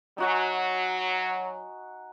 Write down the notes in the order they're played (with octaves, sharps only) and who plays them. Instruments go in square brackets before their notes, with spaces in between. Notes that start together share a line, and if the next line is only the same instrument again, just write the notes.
[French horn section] F#3 [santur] D#4 F#4 G#5